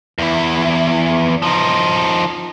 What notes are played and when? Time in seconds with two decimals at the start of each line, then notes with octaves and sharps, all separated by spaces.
0.18 E2 E4
1.42 F3 D#4